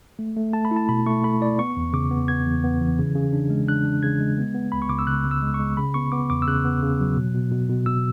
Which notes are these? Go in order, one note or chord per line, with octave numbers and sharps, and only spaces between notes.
A3
A3
A3 A5
B5
E4
A5
B2 B5
A3 C#6
A3 B5
E4 D5
B3 C#6
E2
C#3 D6
B3
B3 G#6
E2
B3
E3
C#3
C#3
D4
G#3
D4 F#6
D4
C#3 G#6
G#3
B3
B3
C#2 B5
C#6
C#2 D6
E6
C#3 F#6
C#2
E6
G#3
C#6
G#3
C#3 B5
B3 C#6
B3 D6
E2 D6
E6
C#3 F#6
B3
C#3
F#3
B2
B2
B2
B2
B2 E6